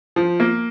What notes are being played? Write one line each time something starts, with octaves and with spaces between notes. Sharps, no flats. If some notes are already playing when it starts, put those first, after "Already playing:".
F3
A#3